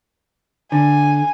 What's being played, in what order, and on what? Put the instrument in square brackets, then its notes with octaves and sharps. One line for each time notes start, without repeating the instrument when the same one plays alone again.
[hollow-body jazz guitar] D3 [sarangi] G#5